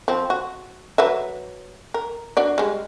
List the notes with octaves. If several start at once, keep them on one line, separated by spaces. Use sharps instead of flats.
F3 C4
F#4
F#3 B4 E5
A#4
D4 F#4 D5
G3 G#3